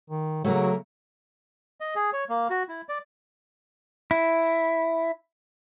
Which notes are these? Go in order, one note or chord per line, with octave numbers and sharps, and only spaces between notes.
D#3
C#3 F#3 A3 A#3 A#4
D#5
G#4
C#5
A#3
F#4
E4
D5
E4